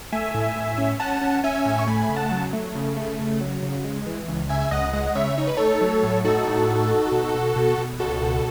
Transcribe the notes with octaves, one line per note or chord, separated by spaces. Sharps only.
A3 E5 G#5
A2
A2
C#4
C#4 F#5 A5
C#4
C#4 E5 G#5
A2
C#6
A3 G#5 B5
C#3
F#5 A5
F#3
A3
C#3
A3
C#3
F#3
C#3
G#3
E3
C#2
C#3 E5 G#5
C#2 D#5 F#5
G#3 D#5 F#5
C#3 C#5 E5
D#4 C#5
B4
A3 A4 C#5
F#3
A2
D#4 F#4 A4
A2
D#4
D#4
B2
B2
B2
B2
C#2 F#4 A4
B2